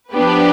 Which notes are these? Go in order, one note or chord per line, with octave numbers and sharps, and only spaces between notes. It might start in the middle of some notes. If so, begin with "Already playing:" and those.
F3 B3 D4 G4 B4